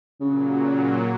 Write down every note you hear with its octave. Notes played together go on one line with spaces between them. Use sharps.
A#2 C#3 F#3